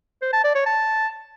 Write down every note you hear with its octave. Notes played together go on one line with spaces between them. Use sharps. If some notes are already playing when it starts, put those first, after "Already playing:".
C5
A5
D5
C#5
A5